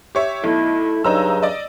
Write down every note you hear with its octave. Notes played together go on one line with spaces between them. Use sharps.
G4 C#5 E5
B1 A3 E4
G2 C#3 F#3 D#4 A#5 E6
D5 D#5